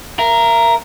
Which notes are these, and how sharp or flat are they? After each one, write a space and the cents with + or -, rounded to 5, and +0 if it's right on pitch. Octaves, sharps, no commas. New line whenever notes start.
A#4 +0 E5 +40